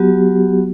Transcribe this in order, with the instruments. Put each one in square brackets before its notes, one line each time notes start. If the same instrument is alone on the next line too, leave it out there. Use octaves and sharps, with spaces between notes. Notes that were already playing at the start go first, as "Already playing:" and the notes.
Already playing: [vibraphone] F#3 B3 F#4 G4